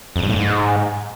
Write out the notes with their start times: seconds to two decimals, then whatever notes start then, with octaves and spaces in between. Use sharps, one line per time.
0.16 F2
0.23 G2
0.29 A2
0.36 G#2